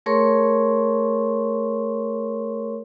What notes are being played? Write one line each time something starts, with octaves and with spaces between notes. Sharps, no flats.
A3 G#4 A#4 C#5 C6 C#6